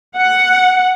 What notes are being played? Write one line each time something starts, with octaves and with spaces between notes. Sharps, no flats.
F#5